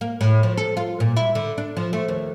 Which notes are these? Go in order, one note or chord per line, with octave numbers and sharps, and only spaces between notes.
A#3
A2
F3
A4
F4
A#2
E4
D3
D4
F3
A3
D#2